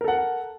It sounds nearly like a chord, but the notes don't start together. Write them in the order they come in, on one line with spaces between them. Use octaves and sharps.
A#4 A4 F#5